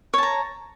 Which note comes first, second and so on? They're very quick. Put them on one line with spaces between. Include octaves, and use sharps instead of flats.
C#5 A5 A#5